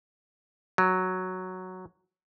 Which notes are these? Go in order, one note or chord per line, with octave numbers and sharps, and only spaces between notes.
F#3